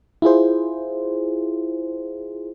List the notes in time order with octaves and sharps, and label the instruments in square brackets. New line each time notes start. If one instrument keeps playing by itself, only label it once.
[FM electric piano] E4 F4 G#4 C5